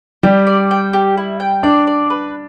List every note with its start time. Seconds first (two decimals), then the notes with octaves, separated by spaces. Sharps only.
0.23 G3 G4
0.47 D5
0.71 G5
0.93 G4
1.17 E4
1.40 G5
1.63 D4 D5
1.87 D5
2.10 B4